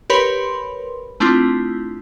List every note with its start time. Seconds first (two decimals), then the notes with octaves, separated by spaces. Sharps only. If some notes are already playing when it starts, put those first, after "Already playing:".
0.10 G4 A#4 B4 C#5 B5 C6
1.20 A3 C4 D4 E4 F4